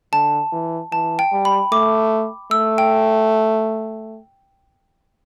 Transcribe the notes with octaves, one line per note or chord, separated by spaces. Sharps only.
D3 A5
E3
E3 A5
G5
G3
B5
A3 D6
A3 E6
G5